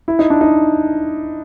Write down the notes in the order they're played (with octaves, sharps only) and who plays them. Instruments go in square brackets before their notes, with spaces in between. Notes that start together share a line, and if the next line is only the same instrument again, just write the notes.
[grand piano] E4
D#4
D4
D#4